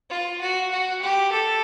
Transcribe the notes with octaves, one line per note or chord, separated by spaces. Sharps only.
F4
F#4
F#4
G4
A4